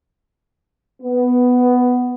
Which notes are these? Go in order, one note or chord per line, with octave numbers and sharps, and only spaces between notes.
B3